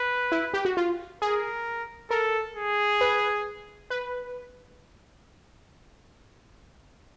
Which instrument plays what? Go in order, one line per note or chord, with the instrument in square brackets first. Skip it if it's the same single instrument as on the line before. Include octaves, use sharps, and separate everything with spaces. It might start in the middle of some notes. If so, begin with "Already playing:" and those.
Already playing: [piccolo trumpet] B4
[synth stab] E4
G4
F#4
F4
[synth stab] G#4 [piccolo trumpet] A#4
[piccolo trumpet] A4 [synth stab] A#4
[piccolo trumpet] G#4
[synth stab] B4
B4